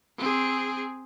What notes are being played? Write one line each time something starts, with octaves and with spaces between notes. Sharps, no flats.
C4 G#4